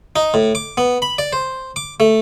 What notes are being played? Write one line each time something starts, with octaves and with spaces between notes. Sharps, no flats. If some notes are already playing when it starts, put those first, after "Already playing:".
D#4
A2
D6
B3
B5
D5
C5
D6
A3